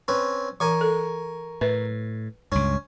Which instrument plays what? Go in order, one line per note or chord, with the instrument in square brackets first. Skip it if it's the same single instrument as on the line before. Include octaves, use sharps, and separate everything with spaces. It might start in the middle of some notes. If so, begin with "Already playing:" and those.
[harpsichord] C4 C#4 B4
[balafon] E3 [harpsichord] A#4 G#5 C#6
[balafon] A4
[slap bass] A2 [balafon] B4
[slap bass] C#2 G2 [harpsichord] C#4